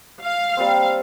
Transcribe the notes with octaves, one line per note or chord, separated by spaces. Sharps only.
F5
G3 A#3 C4